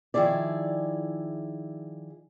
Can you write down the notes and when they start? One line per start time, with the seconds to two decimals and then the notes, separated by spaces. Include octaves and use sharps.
0.14 D#3 F3 E4 G#4 D5